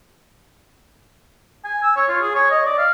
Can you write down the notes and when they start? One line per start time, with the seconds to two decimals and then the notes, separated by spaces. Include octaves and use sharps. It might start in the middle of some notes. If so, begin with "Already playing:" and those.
1.65 G#5
1.83 E6
1.96 C#5
2.08 F4
2.21 G#4
2.35 C#5
2.51 D#5
2.66 D5
2.78 F5